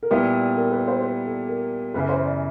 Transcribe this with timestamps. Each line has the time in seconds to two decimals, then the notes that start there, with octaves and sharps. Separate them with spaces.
0.03 A#4
0.11 A#2 G3 B3 E4 G4 B4
0.57 A#4
0.71 B4
0.88 C5
1.02 B4
1.25 A4
1.49 A#4
1.94 F#2 C#3 E3 B4
2.09 C5
2.25 D5